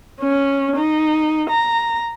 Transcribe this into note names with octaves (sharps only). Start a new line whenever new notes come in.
C#4
D#4
A#5